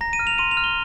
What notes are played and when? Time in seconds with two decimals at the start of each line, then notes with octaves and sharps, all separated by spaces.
0.01 A#5 A#6
0.13 D#7
0.19 F6
0.27 F7
0.38 C6 D#7
0.51 F7
0.57 F6
0.64 G7